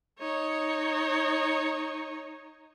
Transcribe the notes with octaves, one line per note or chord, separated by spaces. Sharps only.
D#4 C#5